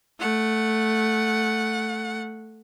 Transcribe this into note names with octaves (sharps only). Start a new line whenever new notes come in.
A3 F#5